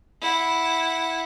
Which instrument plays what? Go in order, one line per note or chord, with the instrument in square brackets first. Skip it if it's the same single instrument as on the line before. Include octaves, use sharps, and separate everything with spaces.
[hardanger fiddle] E4 F#5